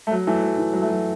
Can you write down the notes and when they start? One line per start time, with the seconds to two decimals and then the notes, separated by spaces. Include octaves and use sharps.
0.07 A3
0.12 F#3
0.27 E3 A3
0.43 F#3
0.58 E3
0.73 F#3
0.82 A3
0.89 F#3